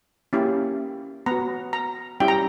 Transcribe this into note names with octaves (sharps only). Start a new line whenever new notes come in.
A#3 C#4 E4 G4
B3 F#4 A#5
A#5
G3 C#4 E4 G4 G5
A#5